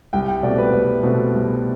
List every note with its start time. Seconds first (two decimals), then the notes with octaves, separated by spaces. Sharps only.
0.13 C2 G5
0.28 G5
0.43 B2 A3 C4 D5
0.58 B4
0.73 C2
1.03 B2 A3 C4
1.33 C2